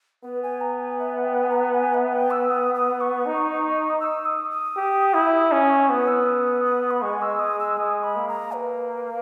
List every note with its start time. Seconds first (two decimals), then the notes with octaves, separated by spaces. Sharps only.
0.23 B3 B4
0.43 G#5
0.61 A#5
0.80 G#5
0.99 E5
1.24 G5
1.43 G#5
1.50 A#5
1.74 G#5
1.94 E5
2.12 G5
2.31 E6
2.51 D#6
2.75 D#6
3.01 C#6
3.26 D#4
3.89 D#6
4.00 E6
4.25 D#6
4.50 D#6
4.76 G4
5.14 E4
5.52 C#4 D#6
5.64 D#6
5.70 C#6
5.89 B3 D#6
6.08 E6
6.26 D#6
6.65 D#6
6.91 B5
7.02 G#3 C#6
7.22 E6
7.40 D#6
7.60 E6
7.77 G#3 D#6
8.03 B5
8.16 A#3
8.28 A#5
8.53 B4